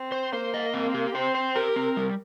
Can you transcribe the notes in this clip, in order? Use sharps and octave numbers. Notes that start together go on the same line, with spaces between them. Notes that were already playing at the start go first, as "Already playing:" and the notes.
Already playing: C4
C5
A#3 C5
D#5
C4
G4
C4 C5
C5
G4 A#4
C4
G3